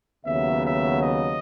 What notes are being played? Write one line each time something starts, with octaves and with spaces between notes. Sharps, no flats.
D#2 C#3 F#3 B3 E5
E5
D#5